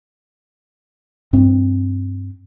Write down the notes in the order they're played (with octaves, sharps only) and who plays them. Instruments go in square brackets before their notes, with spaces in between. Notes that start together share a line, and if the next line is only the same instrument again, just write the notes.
[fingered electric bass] G2 C4